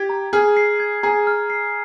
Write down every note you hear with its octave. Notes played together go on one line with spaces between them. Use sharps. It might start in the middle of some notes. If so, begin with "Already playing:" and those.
Already playing: G4 G#6
A#5
G#4 F6
C7
G#6
G#4 A#5
F6
C7